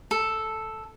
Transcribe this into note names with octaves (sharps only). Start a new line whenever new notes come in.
A4